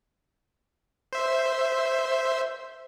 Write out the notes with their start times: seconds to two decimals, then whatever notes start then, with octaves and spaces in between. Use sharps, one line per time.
1.13 C5 E5